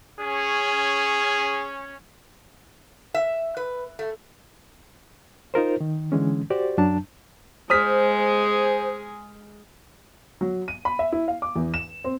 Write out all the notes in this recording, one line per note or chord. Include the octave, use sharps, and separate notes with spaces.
C#4 G#4
E5
B4
A3
D#4 F4 A#4 C5
D#3
D3 E3 G#3 C#4
F#4 G4 C5 D5
F#2 F#3 D4 A5
G#3 G#4 C5 D#6 F6 B6
F#3
D#7
B5
E5
E4
F5
D6
E2
E7
C4